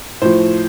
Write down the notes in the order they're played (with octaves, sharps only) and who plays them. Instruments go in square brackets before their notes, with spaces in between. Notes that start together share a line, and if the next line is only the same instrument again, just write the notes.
[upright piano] A2 F3 C5